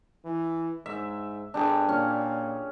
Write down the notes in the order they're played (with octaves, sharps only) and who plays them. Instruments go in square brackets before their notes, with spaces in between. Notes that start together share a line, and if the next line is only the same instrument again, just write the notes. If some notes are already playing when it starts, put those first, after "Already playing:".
[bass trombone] E3
[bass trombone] G#2 [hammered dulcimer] E5
[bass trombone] G1 [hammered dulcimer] D4 G4 G#4
[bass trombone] A#2 [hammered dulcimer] C#4